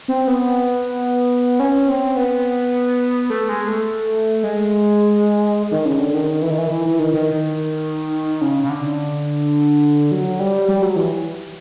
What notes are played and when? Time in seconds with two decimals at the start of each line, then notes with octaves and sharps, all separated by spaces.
0.08 C4
0.27 B3
1.60 C#4
1.88 C4
2.16 B3
3.30 A3
3.49 G#3
3.68 A3
4.43 G#3
5.71 D#3
5.85 C#3
5.99 D3
6.14 D#3
6.42 E3
6.50 D#3
6.58 E3
6.70 E3
6.85 E3
6.99 D#3
7.13 D#3
8.41 C#3
8.63 C#3
8.70 D3
10.12 F#3
10.40 G3
10.68 G3
10.82 F#3
10.96 E3